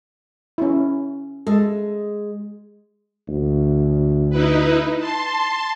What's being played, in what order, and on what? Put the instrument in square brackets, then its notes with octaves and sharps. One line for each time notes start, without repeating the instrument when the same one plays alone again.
[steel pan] C#4 E4
[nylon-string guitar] G#3 [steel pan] A4
[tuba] D2
[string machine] D#4 E4 B4
A5 C6